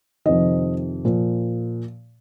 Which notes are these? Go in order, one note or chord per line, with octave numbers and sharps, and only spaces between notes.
F2 C3 D#3 D#5
A#2 F3